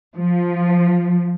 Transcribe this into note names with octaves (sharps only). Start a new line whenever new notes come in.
F3